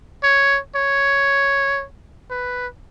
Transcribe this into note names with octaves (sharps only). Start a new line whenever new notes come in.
C#5
C#5
B4